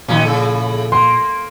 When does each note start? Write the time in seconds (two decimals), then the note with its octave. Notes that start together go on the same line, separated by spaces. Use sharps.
0.08 A#2 D#3 F3 F#3 C#4 B5
0.25 A2 C#3 A4
0.92 A#3 C6